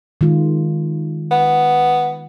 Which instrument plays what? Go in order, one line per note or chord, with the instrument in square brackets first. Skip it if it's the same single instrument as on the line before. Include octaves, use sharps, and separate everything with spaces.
[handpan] D#3 G#3 F4
[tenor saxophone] B3